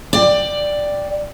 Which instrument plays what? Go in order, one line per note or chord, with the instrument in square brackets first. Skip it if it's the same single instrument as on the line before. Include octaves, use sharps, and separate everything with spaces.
[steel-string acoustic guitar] D5 G5